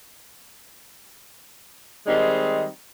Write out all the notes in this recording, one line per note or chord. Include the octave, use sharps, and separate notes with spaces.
D#3 G3 G#3 C4 D#4